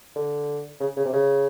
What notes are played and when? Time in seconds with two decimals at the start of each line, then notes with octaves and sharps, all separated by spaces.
0.16 D3
0.80 C#3
0.96 C#3
1.05 C3
1.13 C#3